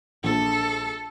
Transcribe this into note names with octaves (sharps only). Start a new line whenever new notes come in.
A#1 A4